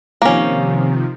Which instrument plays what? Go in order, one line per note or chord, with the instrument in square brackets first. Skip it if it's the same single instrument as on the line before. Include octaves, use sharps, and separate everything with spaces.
[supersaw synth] C3 D#3 F3 [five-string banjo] A#3 C#4